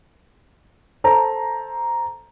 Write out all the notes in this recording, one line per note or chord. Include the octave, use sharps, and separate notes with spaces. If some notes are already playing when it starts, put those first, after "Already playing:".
A4 C5 A#5